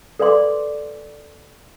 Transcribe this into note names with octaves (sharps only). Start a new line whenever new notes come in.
A4 B4 D5 F5 C6 D6